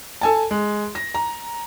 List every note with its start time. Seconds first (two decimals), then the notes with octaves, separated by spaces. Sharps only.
0.21 A4 G#5 A5
0.51 G#3
0.95 A#6
1.14 A#5